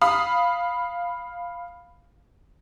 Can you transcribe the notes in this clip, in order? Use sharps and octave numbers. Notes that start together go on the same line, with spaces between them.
F5 B5 D#6